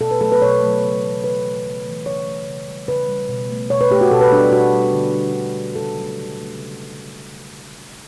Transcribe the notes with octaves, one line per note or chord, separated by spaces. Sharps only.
B2 A4
B4
F#3 A3 A4
B4
B2 C#5
F#3 A3
C#3
E3 A3
C#3 B4
E3 A3
C#3
E3 A3
C#3 C#5
E3 A3
C#3
G3
C#3 B4
G3
B2
A3
B2 C#5
B4
A3 G4
F#4
B2 A4
B4
G3 D4
B2 F#4
G3
D3
G3
D3
G3
C#3 A4
F#3 A3
C#3
F#3 A3
C#3